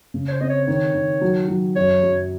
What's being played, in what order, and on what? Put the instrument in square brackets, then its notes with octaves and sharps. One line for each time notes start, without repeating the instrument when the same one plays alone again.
[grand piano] C#3
[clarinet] C#5
C5
[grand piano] C4 [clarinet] D#5
[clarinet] C#5
[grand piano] D#3 [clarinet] C#5
[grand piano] D#3
F#3
F#3
[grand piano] F#2 [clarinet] C#5
[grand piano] F#2